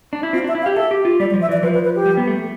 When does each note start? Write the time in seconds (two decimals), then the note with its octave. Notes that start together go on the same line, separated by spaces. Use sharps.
0.13 D4
0.23 E4
0.33 C4 F4
0.44 D4 E5
0.55 E4
0.62 F5
0.66 G4
0.76 A4 E5
0.91 G4
1.05 F4
1.20 G3 D5
1.31 D5
1.34 F3
1.41 E5
1.49 E3 D5
1.63 F3 B4
1.74 B4
1.85 B4
1.95 G4
2.06 G3
2.17 B3
2.27 A3